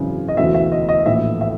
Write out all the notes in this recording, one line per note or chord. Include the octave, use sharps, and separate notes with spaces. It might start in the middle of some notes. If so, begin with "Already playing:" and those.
Already playing: G#1 F#2 C#3 E3
D#5
E1 D2 C#3 E3 E5
E5
D#5
D#5
A#1 A2 E3 E5
E5